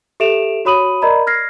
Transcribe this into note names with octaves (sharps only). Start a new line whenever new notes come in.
G4 A4 E5 D7 E7 F7
F#4 C#5 B5 D#6 D#7 F#7
A#4 D5 D#5 A#5 B5
F6 G#6 A#6 C7